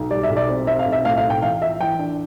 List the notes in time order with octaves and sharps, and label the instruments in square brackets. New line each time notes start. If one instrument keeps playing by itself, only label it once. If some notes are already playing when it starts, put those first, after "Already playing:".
Already playing: [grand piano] B1
[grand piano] G3 [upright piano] D5
[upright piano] E5
[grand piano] B1
[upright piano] D5
[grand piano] C4
[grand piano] C4 [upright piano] E5
[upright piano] F5
[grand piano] B1
[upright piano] E5
[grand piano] A2 [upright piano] F5
[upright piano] F5
[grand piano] B1
[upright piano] G5
[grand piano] E3 [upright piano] F5
[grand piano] F4 [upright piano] E5
[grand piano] E3 [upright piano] G5
[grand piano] D4